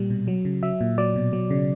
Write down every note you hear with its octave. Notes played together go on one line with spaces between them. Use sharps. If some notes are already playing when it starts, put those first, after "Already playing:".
Already playing: A#2 G3
B2
F#3
C#3
F#3 E5
A#2
F#3 D5
B2
F#3
C#3